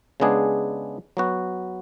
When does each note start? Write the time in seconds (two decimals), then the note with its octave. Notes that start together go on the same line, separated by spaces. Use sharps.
0.20 C#3 G#3 B3 D4 G#4
1.17 F#3 B3 F#4